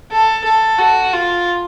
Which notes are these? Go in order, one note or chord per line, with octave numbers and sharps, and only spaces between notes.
A4
A4
F#4
F4